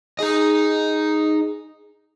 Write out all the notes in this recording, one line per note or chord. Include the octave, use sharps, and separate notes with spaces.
G#2 D#4 G#4 D#5